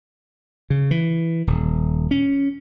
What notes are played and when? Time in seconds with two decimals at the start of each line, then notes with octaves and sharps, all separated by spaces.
0.70 C#3
0.91 E3
1.47 D#1
2.11 C#4